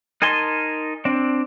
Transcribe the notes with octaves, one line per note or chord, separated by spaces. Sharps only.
D#4 A#4 G#5 A5 C6
C4 D4